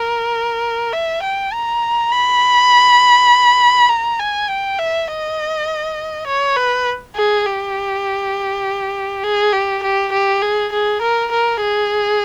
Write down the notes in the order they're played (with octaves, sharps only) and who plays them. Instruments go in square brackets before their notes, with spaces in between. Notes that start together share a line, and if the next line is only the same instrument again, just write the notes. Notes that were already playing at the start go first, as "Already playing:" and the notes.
Already playing: [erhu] A#4
E5
G5
A#5
B5
A#5
G#5
G5
E5
D#5
C#5
B4
G#4
G4
G#4
G4
G4
G4
G#4
G#4
A#4
A#4
G#4